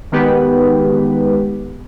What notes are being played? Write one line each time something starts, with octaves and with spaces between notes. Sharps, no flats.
D#3 G#3 B3 G4 B4